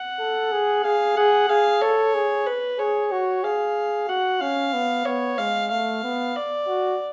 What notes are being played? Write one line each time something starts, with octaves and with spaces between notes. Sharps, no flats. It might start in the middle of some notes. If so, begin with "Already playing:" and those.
Already playing: F#5
A4
G#4
G#4 F5
G#4 F#5
G#4 F5
A4 C#5
G#4
B4
G#4 C#5
F#4 C#5
G#4 F5
F#4 F#5
C#4 F5
B3
B3 C#5
G#3 F5
A3 F5
B3
D5
F#4